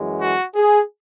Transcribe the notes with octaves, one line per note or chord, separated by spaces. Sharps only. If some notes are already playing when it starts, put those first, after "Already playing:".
Already playing: F#2 E3 G#3
F#4
G#4